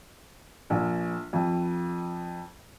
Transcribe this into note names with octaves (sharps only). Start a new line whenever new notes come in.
A#1
F2